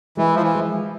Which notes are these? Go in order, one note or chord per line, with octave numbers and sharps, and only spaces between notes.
E3 G#3
F3
E3
G#3